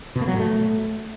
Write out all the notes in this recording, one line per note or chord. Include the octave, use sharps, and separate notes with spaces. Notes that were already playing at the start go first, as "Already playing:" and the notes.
B2
A#3
F#3
A2
A3